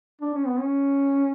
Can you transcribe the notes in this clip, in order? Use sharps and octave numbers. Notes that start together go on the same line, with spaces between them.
D4
C#4
B3
C#4